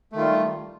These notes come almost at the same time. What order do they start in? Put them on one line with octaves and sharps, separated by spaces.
A3 D#3 F4 G3